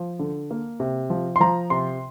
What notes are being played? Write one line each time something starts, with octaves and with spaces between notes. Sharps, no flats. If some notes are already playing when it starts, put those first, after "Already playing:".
Already playing: F3
D3
A#3
C3
F3
C6
F3 A#5
C3 C6